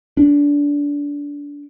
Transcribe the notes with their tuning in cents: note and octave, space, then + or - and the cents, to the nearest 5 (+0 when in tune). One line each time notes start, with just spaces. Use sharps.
D4 -25